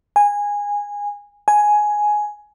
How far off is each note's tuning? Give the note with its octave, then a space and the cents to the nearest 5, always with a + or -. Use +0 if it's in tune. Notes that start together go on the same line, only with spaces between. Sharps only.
G#5 -15
G#5 +10